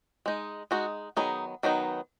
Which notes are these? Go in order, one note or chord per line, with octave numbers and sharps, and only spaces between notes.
G#3 D#4
G#3 D#4 F#4
D#3 F#3 B3 D#4 G#4
D#3 F#3 B3 D#4